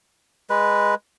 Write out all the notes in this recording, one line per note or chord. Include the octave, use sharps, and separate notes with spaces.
G#3 B4